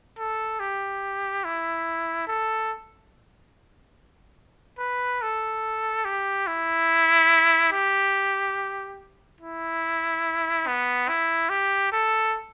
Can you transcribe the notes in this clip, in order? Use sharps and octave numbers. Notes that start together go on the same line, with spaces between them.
A4
G4
E4
A4
B4
A4
G4
E4
G4
E4
B3
E4
G4
A4